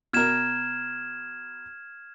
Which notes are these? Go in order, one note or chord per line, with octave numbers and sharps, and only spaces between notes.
B2 A#4 F6 G#6 E7